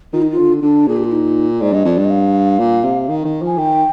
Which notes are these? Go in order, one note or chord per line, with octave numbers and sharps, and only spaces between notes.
D#3 F4
D#4
F4
D3
D3 D4
A#2 G#4
G4
F4
D#4
G#2 D5
G2 D#5
F2 D5
G2
D#5
F5
A#2
C3
D#3
D#3
F3 G#5
D#3 G5